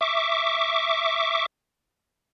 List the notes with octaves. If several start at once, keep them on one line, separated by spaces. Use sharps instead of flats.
E5 C#6 D6